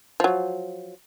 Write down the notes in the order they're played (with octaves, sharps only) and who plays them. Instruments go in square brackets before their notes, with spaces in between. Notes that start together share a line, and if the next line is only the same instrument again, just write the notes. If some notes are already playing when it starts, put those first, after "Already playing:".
[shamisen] F3 F#3